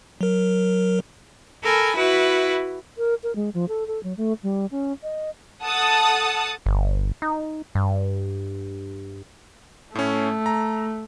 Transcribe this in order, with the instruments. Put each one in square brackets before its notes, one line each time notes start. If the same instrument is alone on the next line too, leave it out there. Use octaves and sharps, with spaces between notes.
[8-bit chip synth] F#3 A#4
[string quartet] A4 A#4 G#5 B5
E4 F#4 B4
[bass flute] A#4
A#4
G#3
F3
A4
A4
F#3
A3
G3
C#4
D#5
[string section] A4 F#5 A5 D#6
[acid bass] G1
D#4
G2
[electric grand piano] A2 C#4 [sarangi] A3
[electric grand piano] A#5